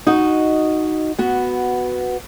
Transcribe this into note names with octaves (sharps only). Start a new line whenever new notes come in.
D#4 F#4 D#5
B3 F#4